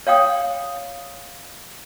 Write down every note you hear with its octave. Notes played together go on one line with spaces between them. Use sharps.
C#5 F5 G5 D#6